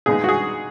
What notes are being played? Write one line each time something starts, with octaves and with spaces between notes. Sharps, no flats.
A#2 G#3 B3 D#4 G#4
F#4
G#4